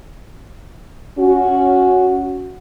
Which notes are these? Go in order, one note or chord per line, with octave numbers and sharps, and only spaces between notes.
C#4 F#4